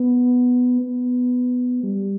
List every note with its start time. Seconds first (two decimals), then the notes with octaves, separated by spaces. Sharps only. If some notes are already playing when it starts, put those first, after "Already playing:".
Already playing: B3
0.80 B3
1.83 G3